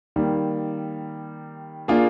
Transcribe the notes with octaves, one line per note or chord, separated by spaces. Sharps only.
D#3 G3 A#3
A#3 D4 F4 G#4